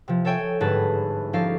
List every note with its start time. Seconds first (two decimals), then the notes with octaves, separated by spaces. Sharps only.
0.08 C3 F3
0.25 A4 C#5 E5 G5 G#5
0.60 G1 G#2 G#4 B4 A5
1.33 F3 C#4 D#4 G4 A4 F5